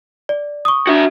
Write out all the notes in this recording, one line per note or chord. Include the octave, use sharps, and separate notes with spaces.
D5
C#6 D#6
D4 F#4 E5